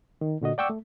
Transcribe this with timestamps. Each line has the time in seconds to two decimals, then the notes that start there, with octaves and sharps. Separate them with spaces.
0.21 D#3
0.41 A#2 D3 F#4 D#5
0.58 D5 F#5 G5 C#6 D6 E6
0.70 A3